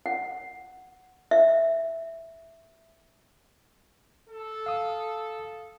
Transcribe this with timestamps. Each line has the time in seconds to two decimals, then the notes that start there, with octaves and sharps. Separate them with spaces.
0.06 F#5
1.31 E5
4.29 A4
4.66 F5 D#6